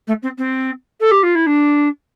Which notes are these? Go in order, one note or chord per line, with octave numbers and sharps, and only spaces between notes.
A3
C4
C4
A4
G4
F4
E4
D4